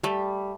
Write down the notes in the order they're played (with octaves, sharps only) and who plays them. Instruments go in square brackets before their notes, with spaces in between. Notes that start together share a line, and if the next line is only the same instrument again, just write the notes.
[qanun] G3 [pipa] A3